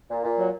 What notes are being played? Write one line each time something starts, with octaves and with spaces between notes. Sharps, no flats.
A#2
A#2
F#3